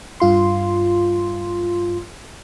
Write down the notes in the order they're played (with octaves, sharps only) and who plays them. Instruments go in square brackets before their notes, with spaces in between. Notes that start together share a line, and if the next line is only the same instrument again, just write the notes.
[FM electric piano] G2 F4 C6